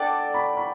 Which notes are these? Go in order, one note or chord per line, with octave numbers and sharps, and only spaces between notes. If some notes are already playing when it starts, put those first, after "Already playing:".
Already playing: D4 A4 D5 F#5 G5 A5
B5
B5